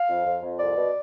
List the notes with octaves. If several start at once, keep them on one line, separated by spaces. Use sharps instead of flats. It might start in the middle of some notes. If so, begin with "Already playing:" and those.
Already playing: F5
F2
F2
F2
C2 D5
B2